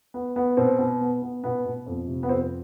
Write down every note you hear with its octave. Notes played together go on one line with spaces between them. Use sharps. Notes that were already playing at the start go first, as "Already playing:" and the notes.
B3
B3
B2 C4
B2
B3
B3
B2 B3
B2
F2
C3
B3
F2 C4